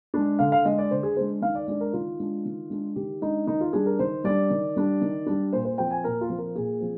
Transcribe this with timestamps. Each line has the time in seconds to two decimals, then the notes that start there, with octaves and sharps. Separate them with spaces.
0.14 G#3 D4
0.39 D3 F5
0.52 F5
0.65 G#3 D4 D#5
0.78 D5
0.91 D3 C5
1.03 G#4
1.16 G#3 D4 C5
1.42 D#3 F5
1.55 D5
1.67 G#3 D4 D5
1.80 A#4
1.93 D#3 F4
2.20 G#3 D4
2.45 D#3
2.70 G#3 D4
2.96 D#3 G4
3.21 G#3 D4 D#4
3.47 D#3 D#4
3.61 F4
3.73 G3 D4 G#4
3.86 A#4
3.99 D#3 C5
4.24 G3 D4 D5
4.50 D#3
4.76 G3 D4
5.01 D#3
5.26 G3 D4
5.53 A#2 C5
5.65 C5
5.78 F3 C4 G5
5.91 G#5
6.04 A#2 A#4
6.21 F4
6.29 F3 C4
6.38 A#4
6.55 A#2 G#4
6.80 F3 C4